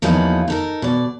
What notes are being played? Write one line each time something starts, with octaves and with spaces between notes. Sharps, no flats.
E2 F3 F#3 A#3 D#4 B4
D#4 A4 A#4
B2 D5